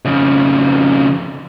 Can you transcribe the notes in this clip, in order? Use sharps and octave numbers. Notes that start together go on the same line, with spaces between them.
F2 C#3